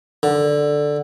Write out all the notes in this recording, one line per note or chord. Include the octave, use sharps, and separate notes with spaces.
D3